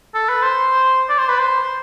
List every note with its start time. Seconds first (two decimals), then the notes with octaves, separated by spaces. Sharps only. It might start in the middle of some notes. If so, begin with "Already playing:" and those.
0.14 A4
0.29 B4
0.43 C5
1.09 D5
1.19 C5
1.29 B4
1.39 C5